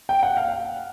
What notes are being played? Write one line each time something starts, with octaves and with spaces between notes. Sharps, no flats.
G5
F#5
F5